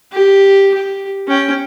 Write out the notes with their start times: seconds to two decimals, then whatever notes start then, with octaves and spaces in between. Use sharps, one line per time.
0.12 G4
0.74 G4
1.28 C#4 G5